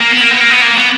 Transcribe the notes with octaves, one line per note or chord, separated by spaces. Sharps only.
A#3
B3
A#3
B3
A#3
B3
A#3
B3